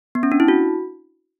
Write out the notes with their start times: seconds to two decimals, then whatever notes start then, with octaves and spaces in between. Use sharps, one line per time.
0.15 B3
0.23 C#4
0.32 D4
0.40 E4
0.48 F#4